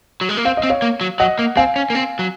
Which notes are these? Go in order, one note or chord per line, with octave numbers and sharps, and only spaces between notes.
F#3
G#3
A#3
C4 F5
D#5
C4
C#5 F5
A#3
F#3
F#3 D#5 F#5
A#3
C4 F5 G#5
C#4
A#3
C4
F#3